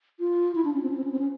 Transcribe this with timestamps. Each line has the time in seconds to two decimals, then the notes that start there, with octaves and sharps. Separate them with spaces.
0.20 F4
0.55 E4
0.65 D4
0.73 C#4
0.83 C4
0.90 C#4
0.97 C4
1.04 C#4
1.12 C4
1.19 C#4